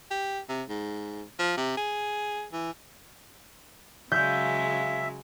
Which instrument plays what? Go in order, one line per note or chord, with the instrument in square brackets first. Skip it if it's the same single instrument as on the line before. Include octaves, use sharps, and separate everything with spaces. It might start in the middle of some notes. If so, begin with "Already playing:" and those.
[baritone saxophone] G4
C3
G#2
F3
C3
G#4
E3
[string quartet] C#3 F#3 G#3 [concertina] E5 [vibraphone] F5 E6 [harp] G6